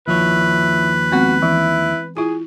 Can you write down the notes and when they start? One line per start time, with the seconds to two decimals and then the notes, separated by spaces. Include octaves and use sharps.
0.08 D#2 F3 E4 B4 C#5
1.12 G#3 B3 C4 F#4
1.42 E3 E4
2.17 E4 F4 G#4